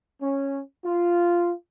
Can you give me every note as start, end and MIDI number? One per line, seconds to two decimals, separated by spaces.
0.21 0.59 61
0.84 1.53 65